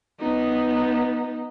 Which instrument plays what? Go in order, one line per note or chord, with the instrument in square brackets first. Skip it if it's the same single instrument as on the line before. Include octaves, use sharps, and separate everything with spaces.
[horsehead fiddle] B3 D#4